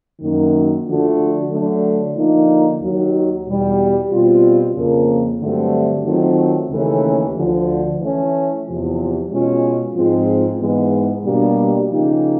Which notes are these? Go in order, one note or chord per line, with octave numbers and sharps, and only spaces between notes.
F#2 D#3 F#3 A#3
D3 F3 A3 D4 F#4
D3 F#3 A3
D3 F3 A#3 D#4
D#2 D#3 F#3
E2 B2 G3
B2 G3 C4 F4
F2 C#3 F3 A#3
G2 D3 F#3 A3 C4
D#3 F#3 A3 C4 F4
D#2 C#3 E3 A3 C#4
D2 D3 F3
E3 A3 C#4
E2 C3 F3
B2 G#3 C#4 F4
G#2 F3 G#3 C4 F4
G#2 E3 G#3 B3
B2 G3 A#3 D4 G4
C#3 F3 A#3 D#4 G4